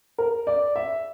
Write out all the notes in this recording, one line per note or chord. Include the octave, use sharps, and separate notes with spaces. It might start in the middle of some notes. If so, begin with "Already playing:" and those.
A#4
D5
E5